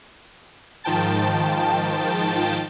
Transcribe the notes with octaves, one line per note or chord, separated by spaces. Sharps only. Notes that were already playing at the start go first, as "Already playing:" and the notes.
G#2 D#3 F3 G5 A5 A6